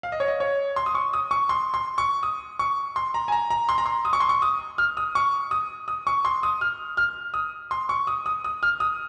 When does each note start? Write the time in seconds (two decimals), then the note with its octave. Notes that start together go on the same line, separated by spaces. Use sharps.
0.03 F5
0.12 D#5
0.20 C#5
0.28 D#5
0.40 C#5
0.76 C6
0.86 D#6
0.95 C#6
1.13 D#6
1.31 C#6
1.49 C6
1.74 C6
1.98 C#6
2.23 D#6
2.59 C#6
2.96 C6
3.14 A#5
3.28 G#5
3.32 A#5
3.50 A#5
3.69 C6
3.78 A#5
3.86 C6
4.05 D#6
4.13 C#6
4.20 C6
4.29 C#6
4.42 D#6
4.78 F6
4.97 D#6
5.15 C#6
5.51 D#6
5.88 D#6
6.07 C#6
6.25 C6
6.43 D#6
6.61 F6
6.97 F6
7.34 D#6
7.71 C6
7.89 C#6
8.07 D#6
8.26 D#6
8.44 D#6
8.63 F6
8.80 D#6